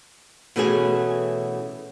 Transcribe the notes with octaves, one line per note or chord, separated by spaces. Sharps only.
B2 E3 A3 C#4 F#4 G#4